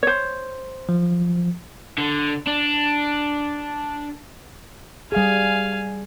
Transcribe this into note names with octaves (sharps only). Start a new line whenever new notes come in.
C5 C#5
F3
D3
D4
G3 G#4 F5 G#5